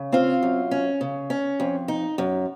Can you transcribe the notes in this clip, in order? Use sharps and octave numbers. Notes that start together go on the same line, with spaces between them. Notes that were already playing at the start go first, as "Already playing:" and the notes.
Already playing: C#3
C4 F4 F5
F#2
C#4
C#3
C#4
F2
D#4
F#2